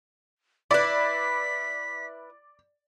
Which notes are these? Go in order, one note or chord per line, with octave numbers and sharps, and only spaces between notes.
E4 B4 D5 B6